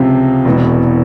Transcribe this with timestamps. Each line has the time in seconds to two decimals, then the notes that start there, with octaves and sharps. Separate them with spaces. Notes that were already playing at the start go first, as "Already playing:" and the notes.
Already playing: C#2 C3 F3 C4
0.45 E1 E2 B2